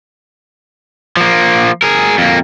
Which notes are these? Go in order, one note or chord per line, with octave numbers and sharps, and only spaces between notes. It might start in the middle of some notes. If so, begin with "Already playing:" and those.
F3 A#3
G#4 A#4
F2 A#3